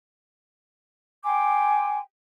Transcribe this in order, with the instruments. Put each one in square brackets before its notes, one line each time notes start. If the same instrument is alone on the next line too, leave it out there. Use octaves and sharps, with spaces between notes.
[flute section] G5 G#5 C6 D6